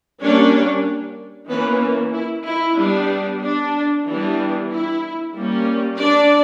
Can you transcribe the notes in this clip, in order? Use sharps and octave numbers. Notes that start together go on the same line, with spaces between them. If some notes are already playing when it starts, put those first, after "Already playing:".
G3 A#3 C#4 D4 C#5
E3 A#3 B3 C#4 B4
E4
E4
G3 B3 D4
D4
E3 G3 B3 D4
E4
G3 A#3 C#4
D4 D5